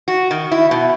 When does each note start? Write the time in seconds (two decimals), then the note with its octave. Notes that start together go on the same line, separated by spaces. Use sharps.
0.08 F#4
0.31 D#3
0.52 E4
0.71 B2